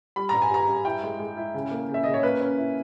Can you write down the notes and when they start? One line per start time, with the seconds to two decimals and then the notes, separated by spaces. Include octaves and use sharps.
0.16 G3 B5
0.29 G2 A#5
0.42 G#5
0.51 G2 A#5
0.68 G2
0.85 E4 G5
1.03 G#3
1.19 G#3
1.37 E4
1.54 C#3
1.71 A#3
1.89 C#3
1.94 E5
2.04 C#3 D#5
2.14 C#5
2.23 A#3 B4
2.40 C#4
2.58 E4